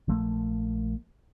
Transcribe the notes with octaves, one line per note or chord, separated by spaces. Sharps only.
A#1 F3 A3 A#3